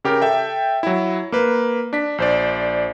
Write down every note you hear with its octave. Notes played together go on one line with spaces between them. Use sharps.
C#3 G4 A#4
A4 E5 G5
F#3 E4
A#3 B4
D4 B6
A#1 C5 D5